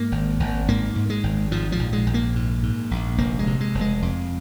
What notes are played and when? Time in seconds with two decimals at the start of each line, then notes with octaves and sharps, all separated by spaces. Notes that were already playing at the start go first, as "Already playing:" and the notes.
Already playing: G#2 A#3
0.12 G#1
0.40 G#1
0.68 G#2 A#3
0.95 G#2
1.10 G#3
1.23 G#1
1.51 G#2 F3
1.72 F3
1.79 A#1
1.93 G#3
2.07 A#1
2.14 A#3
2.35 G#2
2.63 G#2
2.91 A#1
3.18 F1 A#3
3.39 G#3
3.47 C3
3.61 G#3
3.75 F1
3.81 G#3
4.02 F2